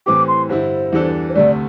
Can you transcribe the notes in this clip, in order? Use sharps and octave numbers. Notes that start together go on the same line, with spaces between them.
A2 E3 C4 G4 D6
C6
G2 D3 G3 E4 C5
E2 E3 G3 D4 A4
C5
D2 C3 A3 D5